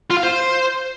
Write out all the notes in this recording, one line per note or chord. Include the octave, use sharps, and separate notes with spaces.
F4
F5
C5